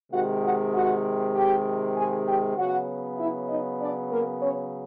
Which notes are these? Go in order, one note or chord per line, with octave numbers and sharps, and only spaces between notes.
C3 D#3 G#3 F#4 F#5
F#4 F#5
F#4 F#5
G4 G5
G#4 G#5
G4 G5
C#3 F#3 B3 F#4 F#5
E4 E5
D#4 D#5
D4 D5
A#3 A#4
C#4 C#5